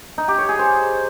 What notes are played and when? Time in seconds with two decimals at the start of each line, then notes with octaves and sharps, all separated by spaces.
0.18 D#4
0.28 G4
0.38 C#5
0.49 G#4
0.59 C5